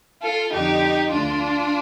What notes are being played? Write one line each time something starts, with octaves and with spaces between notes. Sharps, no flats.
F4 A4
F2 D3 D#4 G4
D2 D3 D4 F4